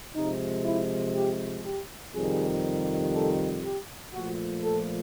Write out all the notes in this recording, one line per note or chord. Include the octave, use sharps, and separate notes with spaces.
C3 F3 G#3 D#4
E4
G4
G4
F2 C3 D#3 G3 G#4
A4
G4
A#2 F3 A3 F#4
A4